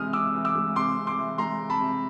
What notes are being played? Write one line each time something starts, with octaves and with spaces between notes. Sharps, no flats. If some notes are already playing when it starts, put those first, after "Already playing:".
Already playing: C3 E3 G#3 D#6 F6
C3 D6 E6
E3
D6 E6
G#3
C3 C6 D6
C3
C6 D6
E3
G#3 A#5 C6
C3
A5 B5
C3